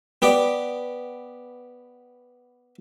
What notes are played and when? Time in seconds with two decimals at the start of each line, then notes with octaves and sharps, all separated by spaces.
0.22 B3 G4 D5